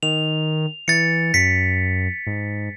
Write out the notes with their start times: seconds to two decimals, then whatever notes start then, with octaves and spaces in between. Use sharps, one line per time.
0.03 D#3 F7
0.88 E3 A6 C#7
1.34 F#2 B6 C#7
2.27 G#2